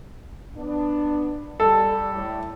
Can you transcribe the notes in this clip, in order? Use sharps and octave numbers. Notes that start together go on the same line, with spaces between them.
B3 D4
G3 A4
A2